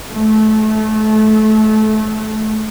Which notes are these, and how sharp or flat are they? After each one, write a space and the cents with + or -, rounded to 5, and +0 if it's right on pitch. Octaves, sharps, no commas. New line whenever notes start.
A3 -25